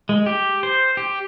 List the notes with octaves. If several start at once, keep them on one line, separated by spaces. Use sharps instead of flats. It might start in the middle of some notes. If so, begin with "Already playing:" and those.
G#3
G4
C5
G4